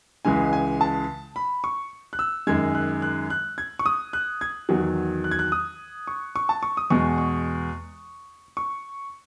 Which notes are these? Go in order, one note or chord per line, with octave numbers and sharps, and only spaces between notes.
C#2 C#3 E3 G#3 G#5
G#5
A5
B5
C#6
F#6
E6
F#2 D#3 G#3 G#6
F#6
F#6
F#6
G#6
C#6
D#6
F#6
G#6
E2 D#3 F#3
F#6
G#6
F#6
D#6
C#6
C#6
A5
C#6
D#6
E2 B2 G#3 C#6
C#6
C#6